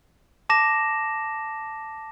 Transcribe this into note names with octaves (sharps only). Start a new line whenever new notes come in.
A5 D6 A#6 E7